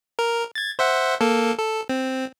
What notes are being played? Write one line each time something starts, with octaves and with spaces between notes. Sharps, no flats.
A#4
G#6 A6
C5 E5 F#5
A#3 A4
A4
C4